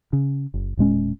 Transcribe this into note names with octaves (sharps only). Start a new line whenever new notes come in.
C#3
F#1
E1 A#2 G#3 C#4